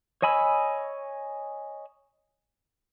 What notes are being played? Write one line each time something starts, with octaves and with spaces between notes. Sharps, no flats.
C#5 D#5 G#5 B5 E6